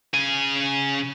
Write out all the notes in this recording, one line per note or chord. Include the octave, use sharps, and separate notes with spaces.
C#3 G#5